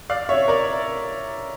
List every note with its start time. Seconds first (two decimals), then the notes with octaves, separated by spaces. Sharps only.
0.10 D5 F5
0.29 C#5 E5
0.48 A#4 D5